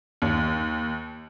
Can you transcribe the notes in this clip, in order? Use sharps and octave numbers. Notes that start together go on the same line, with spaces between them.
D#2